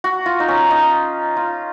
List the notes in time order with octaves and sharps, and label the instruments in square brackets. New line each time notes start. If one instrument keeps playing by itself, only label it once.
[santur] F#4
F4
D#4
C#4
D#4
F4